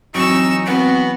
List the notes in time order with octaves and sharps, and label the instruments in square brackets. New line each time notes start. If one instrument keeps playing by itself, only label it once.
[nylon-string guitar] E3 F#3 [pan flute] C4 [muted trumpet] D#4 [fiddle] C#6 E6
[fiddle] B3 [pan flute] C4 [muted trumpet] F#4